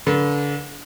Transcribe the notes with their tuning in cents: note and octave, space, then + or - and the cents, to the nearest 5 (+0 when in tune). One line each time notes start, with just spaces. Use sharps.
D3 -35 B4 -45